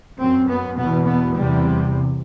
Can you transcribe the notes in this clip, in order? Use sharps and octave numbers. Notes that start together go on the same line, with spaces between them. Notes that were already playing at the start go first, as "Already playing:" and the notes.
F#2 C4
B3
E2 B2 B3
B3
E2 C3 G3